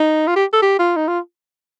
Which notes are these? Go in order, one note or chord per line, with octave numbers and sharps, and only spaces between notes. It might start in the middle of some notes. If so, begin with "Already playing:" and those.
Already playing: D#4
F4
G4
A4
G4
F4
D#4
F4